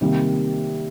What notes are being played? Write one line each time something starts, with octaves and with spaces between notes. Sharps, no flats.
C3 D#3 G3 A#3